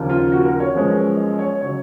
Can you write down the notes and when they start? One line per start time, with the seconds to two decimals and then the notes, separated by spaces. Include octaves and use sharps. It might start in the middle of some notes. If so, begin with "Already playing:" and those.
Already playing: D#2 C#3 F3 A#3
0.09 F4
0.32 F#4
0.45 A#4
0.60 C#5
0.75 F#2 F3 G#3 B3
1.17 D#5
1.39 C#5
1.61 C#3 F#3 C#5